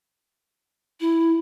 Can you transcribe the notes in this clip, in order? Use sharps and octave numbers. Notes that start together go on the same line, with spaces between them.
E4